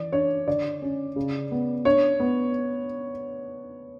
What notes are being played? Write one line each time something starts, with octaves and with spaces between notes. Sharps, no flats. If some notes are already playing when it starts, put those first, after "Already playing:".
Already playing: E3 D5
D4 C#5
D3 D5
C#4
C#3
B3
D4 C#5
B3